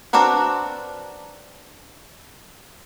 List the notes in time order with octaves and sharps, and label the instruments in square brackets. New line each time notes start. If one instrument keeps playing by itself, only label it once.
[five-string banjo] C4 D4 F#4 A#4 B4